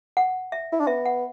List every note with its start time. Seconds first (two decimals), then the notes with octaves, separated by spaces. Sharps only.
0.17 F#5
0.52 E5
0.72 E4
0.80 D4
0.87 B3 E5
1.06 F#5